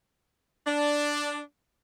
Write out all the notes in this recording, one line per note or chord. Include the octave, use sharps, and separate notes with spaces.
D4